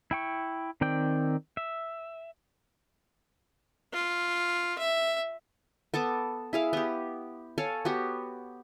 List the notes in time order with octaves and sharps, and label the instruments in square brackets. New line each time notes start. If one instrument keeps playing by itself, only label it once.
[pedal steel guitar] E4 G5 C#6
D#3 C4 D5 G5
E5
[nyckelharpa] F4
E5
[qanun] B3 A4 A5 D6
E4 G#4 F5
B3 G4
A4 C#5 F5 G#5
B3 F#4 G4